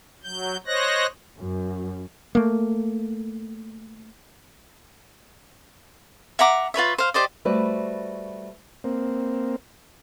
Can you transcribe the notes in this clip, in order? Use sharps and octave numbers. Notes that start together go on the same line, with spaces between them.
F#3 G6
C5 C#5 D#5 F#6 A#6
F#2
A3 A#3
E5 F#5 A#5 D6
F4 B4 C#5 E5
C5 F5
G4 C5 D5 D#5
G3 A3 F#4 B4 C5 D5
A#3 C4